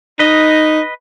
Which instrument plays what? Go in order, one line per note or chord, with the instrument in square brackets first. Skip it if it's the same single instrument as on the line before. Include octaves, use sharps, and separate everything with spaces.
[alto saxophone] D#4 [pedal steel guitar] B4 D#5